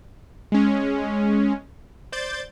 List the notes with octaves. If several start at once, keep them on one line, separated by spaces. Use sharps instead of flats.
G#3 C#4
C5 D5 G6 A6